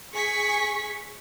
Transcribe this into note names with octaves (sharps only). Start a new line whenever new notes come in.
G#4 C#6 B6